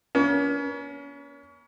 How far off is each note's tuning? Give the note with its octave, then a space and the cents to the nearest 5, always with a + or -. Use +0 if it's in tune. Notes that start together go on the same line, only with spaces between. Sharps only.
A#3 +45 C#4 +35